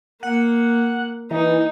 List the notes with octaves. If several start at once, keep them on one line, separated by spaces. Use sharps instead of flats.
A#3 F#5
E3 D#4